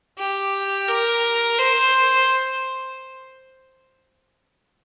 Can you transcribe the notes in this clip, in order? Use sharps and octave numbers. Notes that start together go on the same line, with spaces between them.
G4
A#4
C5